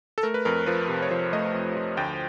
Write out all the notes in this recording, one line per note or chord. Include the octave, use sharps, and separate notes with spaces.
A4
A3 A#4
B4
F2 A#4
F3 B4
C3
C#5
F3 C5
A3 D#5
F2
F3
D2 G5